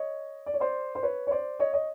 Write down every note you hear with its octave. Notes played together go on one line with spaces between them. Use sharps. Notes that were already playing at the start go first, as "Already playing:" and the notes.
Already playing: C#5 D#5
D5
C#5
C5 D5
C5
B4 C#5
C#5
C5 D5
C#5 D#5
C#5 D#5